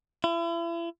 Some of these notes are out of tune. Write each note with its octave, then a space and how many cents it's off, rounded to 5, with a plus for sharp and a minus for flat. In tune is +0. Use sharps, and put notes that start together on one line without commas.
E4 +40